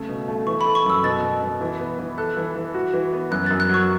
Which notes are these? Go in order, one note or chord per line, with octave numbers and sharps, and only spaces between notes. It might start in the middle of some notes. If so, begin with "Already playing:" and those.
Already playing: C#3 A3
B2
A3
E3 C#6
B5
A4
C#6
F#2 E6
B2 A6
B2
B2
E3
B3
E3
A4 F#6
E3
E3
F#4
E3
B3
F#2 F#6
F#2 A6
F#6
F#3 C#6